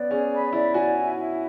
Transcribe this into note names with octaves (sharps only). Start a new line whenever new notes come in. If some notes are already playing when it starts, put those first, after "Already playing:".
Already playing: B3 C#4 D5
C#4 G#4
B5
E4 D5
F#4 G#5
E4
E4